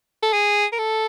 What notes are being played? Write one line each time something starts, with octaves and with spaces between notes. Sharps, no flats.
A4
G#4
A#4
A4